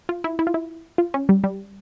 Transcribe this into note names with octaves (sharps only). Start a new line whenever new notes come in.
F4
E4
E4
F4
E4
F4
C#4
G3
G3